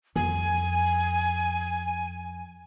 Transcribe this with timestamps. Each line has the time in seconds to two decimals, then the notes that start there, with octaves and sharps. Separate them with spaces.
0.16 F2 G#5